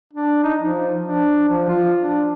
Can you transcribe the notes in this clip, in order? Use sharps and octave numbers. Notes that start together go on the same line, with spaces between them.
D4
D#4
F3
D4
F3
F4
D4